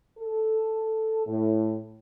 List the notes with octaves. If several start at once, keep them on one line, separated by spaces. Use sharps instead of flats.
A4
A2